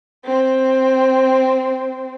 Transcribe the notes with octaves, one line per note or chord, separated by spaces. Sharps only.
C4